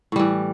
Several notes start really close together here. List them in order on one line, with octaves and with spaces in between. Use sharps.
A2 G3 E3